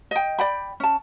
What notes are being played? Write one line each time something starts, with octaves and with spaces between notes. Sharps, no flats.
D#5 G5
D5 G5 B5
C#4 A5